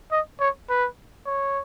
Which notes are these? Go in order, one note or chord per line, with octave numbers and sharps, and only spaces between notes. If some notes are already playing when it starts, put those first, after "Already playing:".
D#5
C#5
B4
C#5